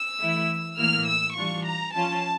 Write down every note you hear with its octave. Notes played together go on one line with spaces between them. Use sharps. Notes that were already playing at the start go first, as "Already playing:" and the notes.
Already playing: E6
E3 A3 E4
A2 E3 A#3 E4 F6
E6
E3 G3 D4 F4 C#6
A#5
F3 C#4 F4 A5